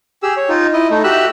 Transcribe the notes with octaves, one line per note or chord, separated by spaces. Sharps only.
G4 G#4 E6
C#5
D#4 F4
E4 D#5
A3 D#4
F#4 G4 E5 E6 F#6